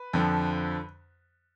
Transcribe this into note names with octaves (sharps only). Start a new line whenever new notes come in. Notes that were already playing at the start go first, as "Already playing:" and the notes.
Already playing: B4
F2 D3 F3